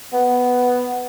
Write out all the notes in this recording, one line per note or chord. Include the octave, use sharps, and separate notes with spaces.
B3